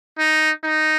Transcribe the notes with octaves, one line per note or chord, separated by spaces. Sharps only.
D#4
D#4